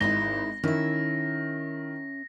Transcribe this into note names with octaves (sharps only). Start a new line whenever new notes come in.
G#1 G#3 D#4 E4 A#6 G7
D#3 C#4 E4 E5